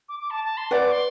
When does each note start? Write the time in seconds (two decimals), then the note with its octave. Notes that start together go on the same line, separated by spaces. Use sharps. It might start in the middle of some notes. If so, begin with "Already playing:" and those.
0.09 D6
0.19 D6
0.30 A5
0.44 A5
0.57 C6
0.71 B4 D5 F#5 D6
0.92 C6